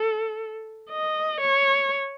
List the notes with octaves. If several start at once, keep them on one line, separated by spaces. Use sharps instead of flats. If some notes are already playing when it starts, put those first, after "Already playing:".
Already playing: A4
D#5
C#5